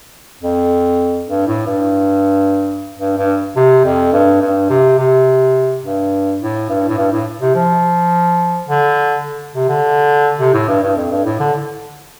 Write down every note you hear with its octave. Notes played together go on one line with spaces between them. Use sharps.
F2
G2
A2
G2
G2
G2
C3
F2
G2
G2
C3
C3
G2
A2
G2
A2
G2
A2
C3
F3
D3
C3
D3
C3
A2
G2
G2
F2
G2
A2
D3